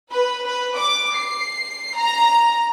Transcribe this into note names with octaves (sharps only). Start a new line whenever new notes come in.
B4
B4
D6
C7
A#5